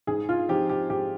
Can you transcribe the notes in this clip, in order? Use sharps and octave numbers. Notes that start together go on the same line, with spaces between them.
G#2 G#4
F4
F3 C4 D#4 G4
G4
G#2 G4